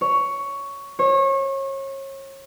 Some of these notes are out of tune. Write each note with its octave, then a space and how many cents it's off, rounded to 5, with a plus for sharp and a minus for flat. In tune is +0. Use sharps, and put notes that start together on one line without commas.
C#5 +10
C#5 -30